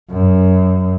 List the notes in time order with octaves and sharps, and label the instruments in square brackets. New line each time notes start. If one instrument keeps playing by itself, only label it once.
[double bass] F#2